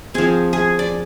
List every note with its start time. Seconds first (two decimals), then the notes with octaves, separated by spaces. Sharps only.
0.14 F3 C4 G#4
0.53 G#4
0.79 D5